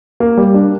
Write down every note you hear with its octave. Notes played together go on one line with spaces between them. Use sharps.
A#3
G3
D4